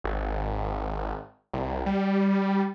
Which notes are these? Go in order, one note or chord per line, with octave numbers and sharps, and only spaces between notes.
G#1
C2
G3